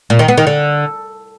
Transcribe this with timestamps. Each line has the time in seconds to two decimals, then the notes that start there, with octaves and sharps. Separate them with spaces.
0.10 A#2
0.19 D#3
0.28 B3
0.37 D#3
0.47 D3